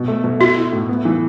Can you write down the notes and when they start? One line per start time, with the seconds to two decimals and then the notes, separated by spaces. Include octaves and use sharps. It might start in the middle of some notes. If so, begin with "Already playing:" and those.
Already playing: B2
0.08 A3
0.24 B2
0.39 E4 F#4
0.56 E4
0.72 A2
0.89 B3
1.05 E3